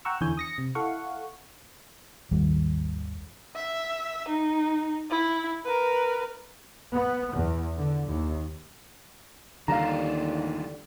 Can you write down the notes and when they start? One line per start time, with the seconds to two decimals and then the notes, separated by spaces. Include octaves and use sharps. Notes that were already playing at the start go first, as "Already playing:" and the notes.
0.05 F#5 G5 A#5 C#6 E6
0.21 E2 D3 E4 C#5 G#5 G6
0.37 D#6 A#6 C#7
0.58 C3
0.75 E4 A4 F5 F#5 C#6
2.31 G#1 D#2 G3
3.56 E5
4.28 D#4
5.10 E4
5.65 A#4 B4
6.95 B3
7.34 E2
7.78 D3
8.09 D#2
9.68 D#2 D3 E3 G3 D4 F4 F5 A#5